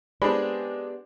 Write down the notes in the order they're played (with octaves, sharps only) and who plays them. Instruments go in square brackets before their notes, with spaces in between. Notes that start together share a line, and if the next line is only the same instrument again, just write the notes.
[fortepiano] G#3 C4 D4 [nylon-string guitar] B3 G4 D5 [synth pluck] B5